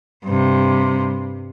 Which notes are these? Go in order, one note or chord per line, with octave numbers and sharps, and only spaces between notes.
G2 C3